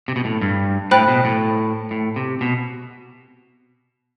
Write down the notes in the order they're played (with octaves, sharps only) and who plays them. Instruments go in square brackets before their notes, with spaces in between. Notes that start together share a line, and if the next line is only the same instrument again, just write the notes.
[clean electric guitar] C3
B2
A2
G2
[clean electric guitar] A2 [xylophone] C5 G5 B5 F#6
[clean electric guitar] B2
A2
A2
C3
B2